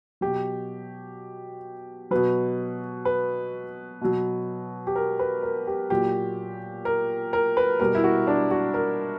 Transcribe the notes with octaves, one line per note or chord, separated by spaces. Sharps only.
B2 F#3 G4
B2 F#3 B4
B4
B2 F#3
G4
A#4
B4
A#4
G4
A#2 F#3 G4
A#4
A#4
B4
B2 G3 A#4
E4
F#4
D4
F#4
A#4